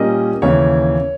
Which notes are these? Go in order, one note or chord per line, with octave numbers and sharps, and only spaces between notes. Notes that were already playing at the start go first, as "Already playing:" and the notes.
Already playing: A#2 G3 A#3 C#4 D#5
D#2 C#3 E3 C#5